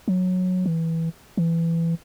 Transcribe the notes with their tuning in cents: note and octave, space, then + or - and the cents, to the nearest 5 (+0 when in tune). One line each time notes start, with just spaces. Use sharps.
F#3 -15
E3 -10
E3 +15